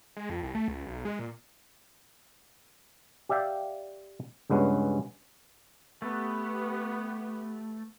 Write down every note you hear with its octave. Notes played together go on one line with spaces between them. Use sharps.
G#3
F2
C2
A3
C#2
B1
G#3
A#2
G4 D5 E5 F5 G5
C#2 G2 G#3 B3 C#4
A3 B3 G4